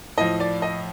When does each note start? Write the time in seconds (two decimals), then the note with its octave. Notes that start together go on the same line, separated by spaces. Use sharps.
0.18 A2 F3 D#5
0.40 D5
0.62 D#5